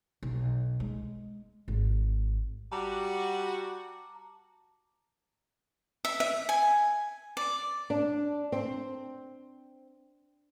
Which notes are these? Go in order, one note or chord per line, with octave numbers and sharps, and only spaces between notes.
B1
G#3
G#1
G3 F#4 A5 A#5 D6
E5
E5
G#5
D5
D4
C4